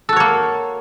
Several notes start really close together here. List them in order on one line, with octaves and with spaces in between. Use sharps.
A4 F#4 C#5 A#3